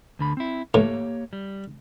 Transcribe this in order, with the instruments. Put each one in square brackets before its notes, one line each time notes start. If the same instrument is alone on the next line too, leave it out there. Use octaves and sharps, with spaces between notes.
[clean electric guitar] D2 D3 B5
C4 E4
[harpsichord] A2 [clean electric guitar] A#3 G4 C#5
[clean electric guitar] G3